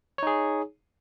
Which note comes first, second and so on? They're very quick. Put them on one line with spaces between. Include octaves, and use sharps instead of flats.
C#5 D#4 G#4